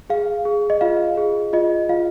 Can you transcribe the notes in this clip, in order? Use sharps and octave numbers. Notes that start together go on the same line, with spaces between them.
G#4 F5
G#4
D#5
F4 F5
G#4
F4 D#5
F4 F5